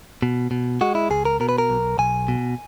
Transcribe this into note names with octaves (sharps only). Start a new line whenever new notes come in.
B2
B2
G#3 F#4
E4
C#2 G#4
A#4
B2 A#4
B4
A#4
B1
B1 G#5
B2